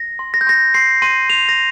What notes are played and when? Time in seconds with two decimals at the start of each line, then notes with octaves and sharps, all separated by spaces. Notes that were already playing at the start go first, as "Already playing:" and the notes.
Already playing: A#6
0.19 C6
0.34 A#6
0.41 G6
0.47 C6 A#6
0.74 C6 C7
1.02 C6 D#7
1.29 C6 F7
1.49 A#6